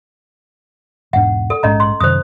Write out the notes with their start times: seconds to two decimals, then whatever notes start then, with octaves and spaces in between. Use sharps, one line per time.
1.13 E1 G#2 D4 F#5
1.50 A4
1.63 A#1 G#2 G#3 C#4 D#5 A#5
1.80 C6
2.00 F#2 C3 D#3 C5 D#6